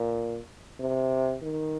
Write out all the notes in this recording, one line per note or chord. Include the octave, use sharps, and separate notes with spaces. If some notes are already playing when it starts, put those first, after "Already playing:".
Already playing: A#2
C3
D#3